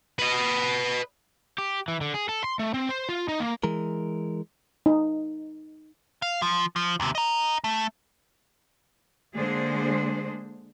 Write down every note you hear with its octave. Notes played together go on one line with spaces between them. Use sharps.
B4 D#5
G4
E3
D3
G#4
A4
C6
A3
C4
C5
F4
D#4
A#3
E3 G#3 A#4
D#4
F5
F3
F3
D#2 C3
D#5 A#5
A3
D3 G#3 A#3 D4 G#4 C5